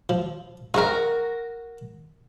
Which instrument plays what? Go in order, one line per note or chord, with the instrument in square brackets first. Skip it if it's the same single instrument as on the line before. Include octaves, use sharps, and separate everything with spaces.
[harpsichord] F3
[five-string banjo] F#4 A#4 [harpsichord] G#4 C5 G5